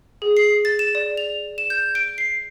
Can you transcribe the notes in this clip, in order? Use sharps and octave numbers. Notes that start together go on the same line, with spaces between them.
G#4
C7
A6
E7
D5
F7
E7
G6
D7
C7